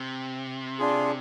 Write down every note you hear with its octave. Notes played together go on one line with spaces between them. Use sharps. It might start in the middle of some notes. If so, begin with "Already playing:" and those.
Already playing: C3
D4 F4 G#4